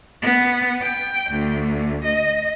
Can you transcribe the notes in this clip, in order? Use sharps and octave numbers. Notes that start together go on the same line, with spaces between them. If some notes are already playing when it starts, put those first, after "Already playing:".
B3
G5
D2
D#5